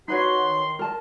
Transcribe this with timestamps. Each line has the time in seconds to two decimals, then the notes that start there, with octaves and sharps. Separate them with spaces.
0.08 D#4 F#4 B4 C#5 C6
0.42 D#3
0.79 A#4 A5